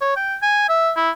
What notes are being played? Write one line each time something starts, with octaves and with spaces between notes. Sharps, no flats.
C#5
G5
G#5
E5
E4